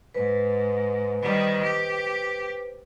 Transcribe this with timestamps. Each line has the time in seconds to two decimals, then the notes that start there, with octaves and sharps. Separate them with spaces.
0.14 G#2 B4 C5
1.22 D#3 G3
1.62 G4